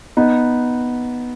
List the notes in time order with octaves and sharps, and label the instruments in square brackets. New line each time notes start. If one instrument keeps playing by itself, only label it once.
[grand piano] B3 D#4